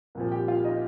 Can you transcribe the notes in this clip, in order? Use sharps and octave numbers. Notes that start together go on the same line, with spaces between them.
C2 A#2 F3
G4 G5
F4 F5
D#4 D#5